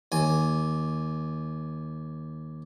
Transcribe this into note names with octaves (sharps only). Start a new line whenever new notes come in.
D#2 G#5